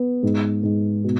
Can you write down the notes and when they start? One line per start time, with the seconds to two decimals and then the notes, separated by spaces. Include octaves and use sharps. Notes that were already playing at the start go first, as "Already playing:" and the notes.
Already playing: B3
0.23 G#2
0.63 G#2
1.04 B2